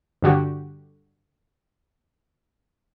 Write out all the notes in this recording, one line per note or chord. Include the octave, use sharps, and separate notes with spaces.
G2 D3 F#4 G4